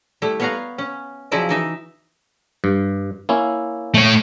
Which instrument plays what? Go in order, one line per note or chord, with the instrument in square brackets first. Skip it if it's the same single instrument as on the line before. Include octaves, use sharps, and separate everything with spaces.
[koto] G3 A3 E4
B3 B4 C#5 F5 F#5 A#5
C#4
C#3 F3 F#3 E4 D5 D#5
E3 D#4 E5
[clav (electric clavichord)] G2
A#3 C#4 E4
[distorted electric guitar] A3 C#5